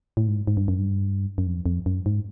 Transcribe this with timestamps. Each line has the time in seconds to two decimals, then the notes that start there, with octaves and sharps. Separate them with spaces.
0.17 A2
0.28 G#2
0.47 G#2
0.57 G2
0.68 F#2
0.79 G2
1.38 F#2
1.47 F2
1.66 F2
1.86 F#2
2.06 G#2